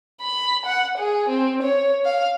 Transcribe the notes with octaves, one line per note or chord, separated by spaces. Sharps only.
B5
F#5
G#4
C4
C#5
F5